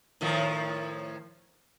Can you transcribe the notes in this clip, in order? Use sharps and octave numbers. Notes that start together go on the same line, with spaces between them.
A2 D#3 F3